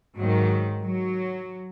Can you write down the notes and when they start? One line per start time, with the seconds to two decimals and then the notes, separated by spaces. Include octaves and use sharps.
0.17 G#2 D#3 F#3
0.84 F#3